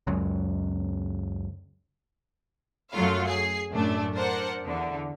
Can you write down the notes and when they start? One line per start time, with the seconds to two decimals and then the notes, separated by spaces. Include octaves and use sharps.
0.07 C#2 F#2
2.92 F#2 F#3 A3 F4 F5
3.27 G#4 C7
3.72 F#2 A2 A3 D4
4.14 D4 A#4 C5 F#5
4.65 E2 D3